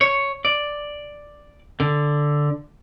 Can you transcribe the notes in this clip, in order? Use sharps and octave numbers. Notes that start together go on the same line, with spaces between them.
C#5
D5
D3